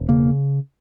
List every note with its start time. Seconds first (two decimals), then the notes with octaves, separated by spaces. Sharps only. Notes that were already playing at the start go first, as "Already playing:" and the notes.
Already playing: E1
0.09 C#3 A#3